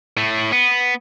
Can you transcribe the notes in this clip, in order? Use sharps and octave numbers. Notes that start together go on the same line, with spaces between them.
A2 A3
B3